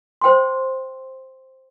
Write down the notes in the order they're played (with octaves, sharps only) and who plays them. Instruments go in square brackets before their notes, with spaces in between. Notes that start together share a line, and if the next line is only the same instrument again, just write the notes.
[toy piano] C5 G5 C6